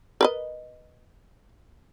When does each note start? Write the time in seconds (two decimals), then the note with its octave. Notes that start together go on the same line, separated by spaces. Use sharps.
0.21 A#4 B4 D#5